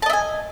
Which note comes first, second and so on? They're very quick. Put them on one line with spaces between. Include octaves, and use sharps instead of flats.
A5 D#5 E5 G#5